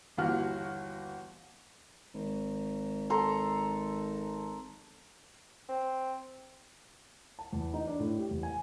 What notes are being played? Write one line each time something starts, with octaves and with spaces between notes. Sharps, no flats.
G1 D#2 E3 F#4 F6
G#1
A4 A#5 C6
C4
A5
E2
D#4
D4
A2
G4
E2
G#5